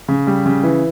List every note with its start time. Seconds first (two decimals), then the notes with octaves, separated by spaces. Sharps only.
0.08 C#3
0.27 G3
0.46 C#3
0.63 E3